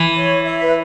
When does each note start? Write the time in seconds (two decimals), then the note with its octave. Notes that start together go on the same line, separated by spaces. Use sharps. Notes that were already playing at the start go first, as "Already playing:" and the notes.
Already playing: E3
0.15 C#5
0.44 E5
0.61 B4